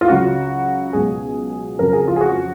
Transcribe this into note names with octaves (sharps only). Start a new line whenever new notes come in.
F4
C#2 C#3 F#3 F#4
C#2 B2 F#3 G#4
F2 C#3 F#3 A#4
G#4
F4
G#4
F#4